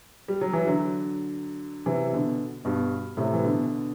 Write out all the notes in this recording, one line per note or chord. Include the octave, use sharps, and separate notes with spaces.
G3
F#3
E3
D3 F#3
C3 E3
B2 D3
G2 B2
A2 C3
E3
B2 D3